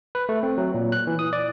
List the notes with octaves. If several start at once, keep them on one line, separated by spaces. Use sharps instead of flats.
B4
A3
C4
F#3
A#2
F#6
E3
D#6
D5